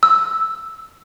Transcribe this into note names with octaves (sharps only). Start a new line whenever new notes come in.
E6